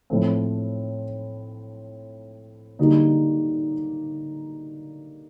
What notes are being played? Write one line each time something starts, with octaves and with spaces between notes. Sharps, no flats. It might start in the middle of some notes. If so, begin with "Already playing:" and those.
A2 F3 A3 C4
D3 G3 A#3 D#4 F#4